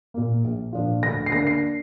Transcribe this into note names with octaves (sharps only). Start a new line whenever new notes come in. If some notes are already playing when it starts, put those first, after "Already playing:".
A#2 A#3
A#1
A#2 F3 D4 F4
D2 A#6
C7
D3 A#3 D4 A#6
C7